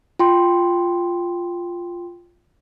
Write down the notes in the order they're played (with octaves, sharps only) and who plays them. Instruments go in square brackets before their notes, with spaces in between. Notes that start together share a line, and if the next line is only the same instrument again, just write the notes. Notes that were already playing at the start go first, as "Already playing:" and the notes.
[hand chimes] F4 G5 C6